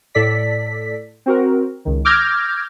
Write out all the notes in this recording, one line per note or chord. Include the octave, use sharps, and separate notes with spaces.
A2 A4 D5 B6
C4 F#4 A#4
C#2 D#3
D6 E6 F6 G6 G#6 A#6